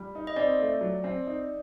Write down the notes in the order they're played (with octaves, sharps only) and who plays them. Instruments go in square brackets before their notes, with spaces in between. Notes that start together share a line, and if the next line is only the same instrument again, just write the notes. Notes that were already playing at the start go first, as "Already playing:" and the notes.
Already playing: [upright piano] G3
D#4
[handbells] D#5
[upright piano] C4 [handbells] D5
[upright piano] A3
F#3
C4
D#4